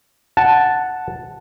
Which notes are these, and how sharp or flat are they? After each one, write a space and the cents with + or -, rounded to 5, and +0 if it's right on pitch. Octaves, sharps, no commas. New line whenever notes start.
F#5 +0 A5 +0